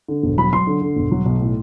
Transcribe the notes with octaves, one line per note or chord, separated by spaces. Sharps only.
D3
E1
F#3 B5
F#3 C6
D3
D3
E1
F#3
B1
A2